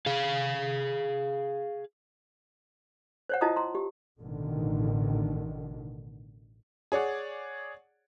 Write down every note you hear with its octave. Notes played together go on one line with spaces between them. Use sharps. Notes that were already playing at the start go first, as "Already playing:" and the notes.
G#4 F5
C5 C#5 F#5
E4 F4 D#5 A5 A#5 D#6
A#5 C6
G4
A1 B2 D3 D#3
G#4 C#5 D5 F#5